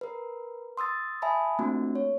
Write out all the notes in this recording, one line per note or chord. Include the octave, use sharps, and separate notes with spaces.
A#4 B4
C6 D#6 E6 A6
E5 G#5 A5 B5 D#6
A3 A#3 C4 D4 F4 F#4
C#5